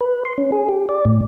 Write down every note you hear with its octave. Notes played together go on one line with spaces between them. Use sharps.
B4
C6
C#4
G#4
G4
D5
A2